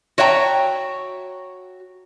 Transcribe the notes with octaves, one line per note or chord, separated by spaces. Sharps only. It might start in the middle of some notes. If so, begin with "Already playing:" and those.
F#4 C#5 E5 G5 A#5